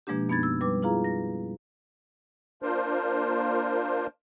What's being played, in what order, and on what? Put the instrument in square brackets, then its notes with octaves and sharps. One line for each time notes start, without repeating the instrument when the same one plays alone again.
[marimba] B2 F3 G#3 A#3 D4 G4
F#2 B3 D#4 B5 G#6 A6
E6
G3 B4 D6
E4 F4 G#4 F5 A#5
A#6
[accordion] A#3 D4 F4 A#4 C5